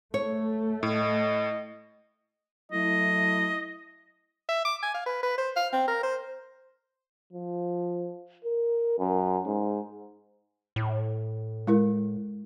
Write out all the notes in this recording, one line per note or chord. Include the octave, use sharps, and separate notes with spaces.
A3 C#5
A2 D#5
F#3 A3 E4 D#5
E5
D6
G#5
F5
B4
B4
C5
F5
C4
A#4
C5
F3
A#4
F#2
G#2
A2
G#3 E4 A#4